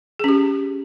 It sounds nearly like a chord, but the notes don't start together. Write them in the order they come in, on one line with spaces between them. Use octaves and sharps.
G#4 C#4 G4